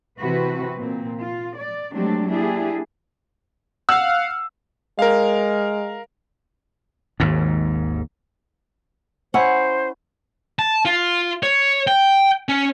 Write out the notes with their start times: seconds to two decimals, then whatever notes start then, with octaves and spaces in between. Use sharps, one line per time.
0.20 C3 E3 C4 F#4 B4
0.77 A#2 C4
1.20 F4
1.57 D5
1.92 F#3 G#3 A3 C4 D4 G4
2.27 A#3 D4 E4 G4 G#4
3.89 F5 F#5 E6
4.99 G#3 A#4 F5
7.20 G#1 D#2 G#2
9.34 C#4 E4 C5 F#5
10.59 A5
10.85 F4
11.43 C#5
11.87 G5
12.49 C#4